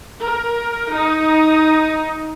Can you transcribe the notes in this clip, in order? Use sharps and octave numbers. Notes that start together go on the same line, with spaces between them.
A#4
D#4